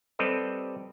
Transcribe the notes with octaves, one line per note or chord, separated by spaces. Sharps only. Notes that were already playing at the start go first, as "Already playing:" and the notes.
G3 C4 G4 A4 B4 D#5